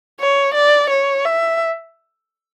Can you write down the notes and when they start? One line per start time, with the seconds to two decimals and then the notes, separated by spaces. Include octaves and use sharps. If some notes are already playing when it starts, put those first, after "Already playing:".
0.20 C#5
0.54 D5
0.90 C#5
1.25 E5